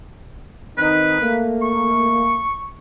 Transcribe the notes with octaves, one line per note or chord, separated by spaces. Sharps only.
D#3 C4 D#4 B4
A3 A#3
C#6